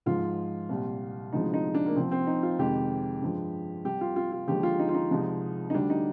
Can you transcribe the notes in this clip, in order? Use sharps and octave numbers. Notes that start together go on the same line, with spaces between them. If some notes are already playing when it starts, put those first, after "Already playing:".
G#2 F3 G#3 F4
C2 A#2 G3
D2 C3 F3 G#3 D#4
D#4
D4
A#3
C2 C3 F3 C4
C4
D#4
F4
F2 C3 D#3 G#3 G4
G2 F3 G#3
C2 C3 G3 G4
F4
F4
F4
D#2 D3 F3 G#3 G4
F4
D#4
F4
D#4
C2 C3 F3 G#3
D#4
D2 D3 G3 D4
D#4